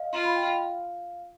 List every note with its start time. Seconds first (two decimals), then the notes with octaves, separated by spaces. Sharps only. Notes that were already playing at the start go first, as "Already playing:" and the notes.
Already playing: D#5 F5
0.12 F4 C6
0.25 B5
0.36 G5
0.47 F5